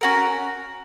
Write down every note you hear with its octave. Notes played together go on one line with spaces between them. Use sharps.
C#4 F#4 A#4